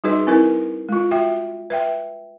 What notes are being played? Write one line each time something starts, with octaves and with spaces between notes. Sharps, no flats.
G3 D#4 F#4 G#4 B4 D#5
C4 E4 A#4 B4
G#3 F4
F#4 E5 G5
B4 E5 G5